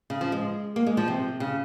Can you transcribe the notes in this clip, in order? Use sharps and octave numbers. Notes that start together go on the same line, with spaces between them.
C#3
F3
G#3
A#3
G#3
F3
C3
C#3